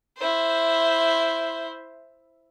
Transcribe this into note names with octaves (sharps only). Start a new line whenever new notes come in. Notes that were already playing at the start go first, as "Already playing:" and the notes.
E4 C5